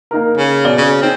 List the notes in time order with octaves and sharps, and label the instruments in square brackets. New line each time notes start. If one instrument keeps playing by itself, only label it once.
[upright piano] A#3 D#4 A#4
[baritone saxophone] C#3
[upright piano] B2 D5 G7
[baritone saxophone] C#3
[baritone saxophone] C4 [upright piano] D#4